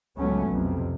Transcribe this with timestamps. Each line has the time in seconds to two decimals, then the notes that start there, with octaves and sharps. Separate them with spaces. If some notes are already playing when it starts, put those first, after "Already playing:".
0.19 C#2 A2 F#3 A3 B3 C#4
0.51 B1 F2 C3